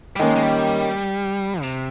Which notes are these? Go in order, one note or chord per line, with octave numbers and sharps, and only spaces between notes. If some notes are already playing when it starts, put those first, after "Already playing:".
G3
D#3 G#3 A#3 C#4
G#3
G3
C3